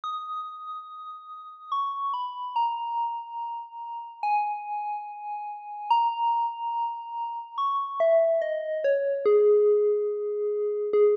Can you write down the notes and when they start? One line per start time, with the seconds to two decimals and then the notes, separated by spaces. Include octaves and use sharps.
0.04 D#6
1.72 C#6
2.14 B5
2.56 A#5
4.23 G#5
5.90 A#5
7.58 C#6
8.00 E5
8.42 D#5
8.84 C#5
9.26 G#4
10.93 G#4